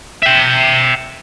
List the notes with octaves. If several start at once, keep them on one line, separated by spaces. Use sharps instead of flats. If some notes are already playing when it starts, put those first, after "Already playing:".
E5 G5